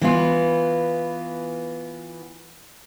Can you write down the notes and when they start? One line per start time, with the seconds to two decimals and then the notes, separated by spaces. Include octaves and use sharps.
0.01 E3 B3 F4